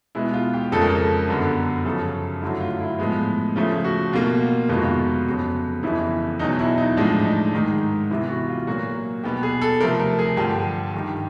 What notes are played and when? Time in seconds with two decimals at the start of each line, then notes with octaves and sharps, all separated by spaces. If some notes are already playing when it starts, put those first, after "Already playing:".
0.15 B2 G#3 B3 E4
0.33 F4
0.53 G4
0.72 F2 C#3 F3 G#3 A4
0.82 A#4
0.90 A4
1.28 F#2 D3 G3 B3
1.85 F#2 C#3 F3 A4
2.42 G2 D3 F#3 A3 E4
2.61 F4
2.80 E4
2.99 A2 F3 G#3 B3
3.56 C#3 F3 A3
3.84 F#4
4.13 B2 G3 A#3 F4
4.69 F2 C3 D#3 G#3 B3 F4
4.76 F#4
4.84 F4
5.26 F2 C#3 F#3 B3
5.83 F2 C#3 E3 G3 B3 E4
6.39 E2 B2 F#3 D#4
6.59 E4
6.78 D#4
6.97 A2 F3 G#3 D4
7.25 D#4
7.54 G#2 D#3 G#3
8.10 C3 E3 G3 B3 E4
8.30 F#4
8.48 F4
8.67 A#2 F#3 A#3 F#4
9.23 B2 G3 B3 G4
9.43 G#4
9.61 A4
9.80 C3 F3 A3 A#4
10.00 A#4
10.19 G#4
10.37 G2 D3 F3 G4
10.94 G2 D#3 G3 G4